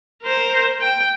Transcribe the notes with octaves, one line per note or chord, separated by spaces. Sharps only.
A#4 C5
G5